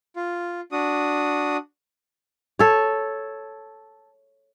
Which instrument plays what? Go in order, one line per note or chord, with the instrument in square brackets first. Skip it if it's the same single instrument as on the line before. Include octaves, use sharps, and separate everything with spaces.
[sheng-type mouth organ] F4
D4 F#4 D#6
[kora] A4 C#5